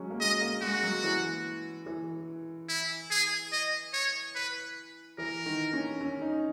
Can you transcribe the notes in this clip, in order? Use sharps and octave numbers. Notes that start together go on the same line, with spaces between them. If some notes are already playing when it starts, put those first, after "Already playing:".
Already playing: F#3 G#3 C#4
A#3
G#3 D#5
A#3
G#3 F#4
F#3
E3
E3
E4
G#4
D#5
C#5
B4
E3 A#4
D#3
C#4
C#4
D#4